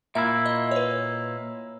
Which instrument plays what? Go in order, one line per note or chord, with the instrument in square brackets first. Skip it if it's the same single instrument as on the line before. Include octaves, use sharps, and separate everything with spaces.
[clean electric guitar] A#2 A#3 E4 [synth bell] E5
[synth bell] D#5
C#5
B4